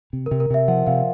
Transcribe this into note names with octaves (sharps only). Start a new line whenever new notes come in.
C3
A#4
C3
A#4
C3 E5
F3 F#5
C3 F5